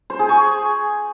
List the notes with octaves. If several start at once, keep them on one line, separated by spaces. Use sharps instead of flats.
C5
G#4
C#6